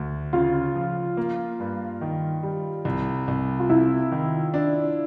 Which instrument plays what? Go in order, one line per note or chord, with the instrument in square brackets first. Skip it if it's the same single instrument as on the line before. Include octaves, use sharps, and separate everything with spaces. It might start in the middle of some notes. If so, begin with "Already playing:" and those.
Already playing: [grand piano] D2
[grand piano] C#3 [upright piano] F4
[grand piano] F3
A#3
G2
D#3
G3
C2
C2
[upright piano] F4
[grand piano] C3 [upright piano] E4
[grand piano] D#3
D4